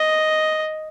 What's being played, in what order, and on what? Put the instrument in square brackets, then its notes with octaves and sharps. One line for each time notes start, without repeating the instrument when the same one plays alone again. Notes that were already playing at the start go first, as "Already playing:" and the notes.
Already playing: [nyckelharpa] D#5